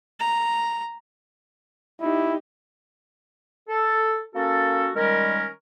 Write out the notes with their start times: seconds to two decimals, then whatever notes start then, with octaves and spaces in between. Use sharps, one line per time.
0.20 A#5
2.01 D#4 E4 G4
3.69 A4
4.35 A#3 C#4 F#4 A4
4.95 D#3 G3 G#3 C#4 A#4